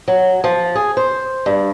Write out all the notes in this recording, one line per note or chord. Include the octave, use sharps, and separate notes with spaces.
F#3
F3
G#4
C5
G2